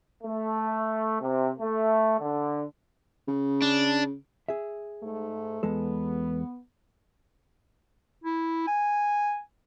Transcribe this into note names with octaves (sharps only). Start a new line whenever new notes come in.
A3
C3
A3
D3
C#3
D4
G#4 E5
G#2 A3
E2 G#3 B3 A4
E4
G#5